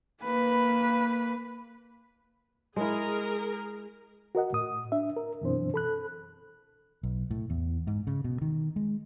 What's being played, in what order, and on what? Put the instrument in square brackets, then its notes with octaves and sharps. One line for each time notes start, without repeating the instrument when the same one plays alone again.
[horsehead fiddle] A#3 B4
[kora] G#3 E4 [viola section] G#4 A#4
[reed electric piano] F#4 A#4 D#5 F#5
A2 D#6
D4 E5
A#4
F#2 B2 E3 C4 D4 C5
A4 B5 F#6
[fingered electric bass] B1
A2
E2
G#2
C#3
B2
D#3
G#3